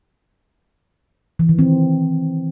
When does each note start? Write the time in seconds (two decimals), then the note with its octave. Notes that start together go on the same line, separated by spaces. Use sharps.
1.39 E3
1.49 D#3
1.59 C4